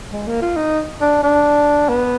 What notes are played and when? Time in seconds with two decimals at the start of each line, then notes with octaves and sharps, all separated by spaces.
0.12 G#3
0.27 A#3
0.42 F4
0.56 D#4
1.01 D4
1.23 D4
1.89 B3